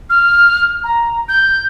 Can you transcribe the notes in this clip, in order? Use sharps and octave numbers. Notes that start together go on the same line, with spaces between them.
F6
A#5
G6